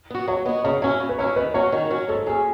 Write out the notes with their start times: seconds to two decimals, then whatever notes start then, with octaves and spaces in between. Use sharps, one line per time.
0.10 B3 F#4
0.27 F#3 C#5
0.45 B3 D#5
0.49 F#4
0.64 C#3 C#5
0.82 F#3 C#4 E4 C#5
1.00 C#3
1.09 B4
1.19 F#3 C#4 E4 C#5
1.36 D#3 B4
1.54 F#3 C#4 F#4 C#5
1.72 D#3
1.90 F#3 C#4 F#4
2.09 G#2 A4
2.27 F#3 C#4 G#4